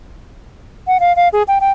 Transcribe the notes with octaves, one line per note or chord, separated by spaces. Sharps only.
F#5
F5
F5
G#4
G5
G5